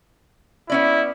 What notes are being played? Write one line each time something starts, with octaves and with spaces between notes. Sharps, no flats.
B3 C#4 E4 D5